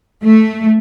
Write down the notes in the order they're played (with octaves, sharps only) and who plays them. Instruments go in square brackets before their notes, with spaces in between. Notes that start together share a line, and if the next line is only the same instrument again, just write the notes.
[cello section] A3